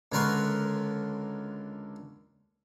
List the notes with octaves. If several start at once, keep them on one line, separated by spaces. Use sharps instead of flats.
C#2 D3 A#4 B4 C6 C#6